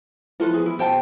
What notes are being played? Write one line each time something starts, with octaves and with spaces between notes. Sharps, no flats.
E3 F3 B3 F4 A4 B4
G#4
E4
B2 C5 G5 A5